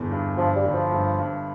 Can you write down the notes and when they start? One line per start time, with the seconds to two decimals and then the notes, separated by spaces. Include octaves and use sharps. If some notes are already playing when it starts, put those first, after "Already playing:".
Already playing: G1 E2
0.11 G2
0.38 G2 F3
0.56 G3
0.65 G1
0.74 F3
0.92 G2
1.19 G2